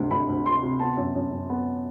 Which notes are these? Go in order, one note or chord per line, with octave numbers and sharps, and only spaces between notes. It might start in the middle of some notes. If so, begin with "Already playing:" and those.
Already playing: D2 C3 G3
D2 B5
D2
C3 C6
C3
B3 A5
F#2
F#2
F#2
B3